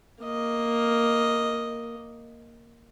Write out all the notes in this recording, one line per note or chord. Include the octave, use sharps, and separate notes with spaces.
A#3 D#5